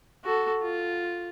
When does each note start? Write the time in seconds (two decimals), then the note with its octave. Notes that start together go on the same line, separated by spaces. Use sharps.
0.24 F#4 A4
0.62 F4